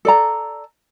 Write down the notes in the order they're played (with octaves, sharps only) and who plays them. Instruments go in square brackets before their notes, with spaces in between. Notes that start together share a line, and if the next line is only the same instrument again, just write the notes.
[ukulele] A4 D5 A#5